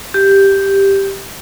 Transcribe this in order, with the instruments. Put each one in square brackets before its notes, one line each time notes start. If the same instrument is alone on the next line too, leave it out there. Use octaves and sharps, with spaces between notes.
[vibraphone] G4